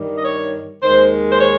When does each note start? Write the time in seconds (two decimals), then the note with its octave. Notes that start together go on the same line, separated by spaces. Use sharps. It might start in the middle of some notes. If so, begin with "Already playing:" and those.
Already playing: G2 D#3 G3
0.17 D#5
0.24 C#5
0.82 D#2 D#3 G#3 C5
1.32 C5
1.39 C#5